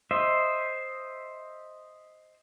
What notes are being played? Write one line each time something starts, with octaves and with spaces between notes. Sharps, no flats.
C5 D#5 E5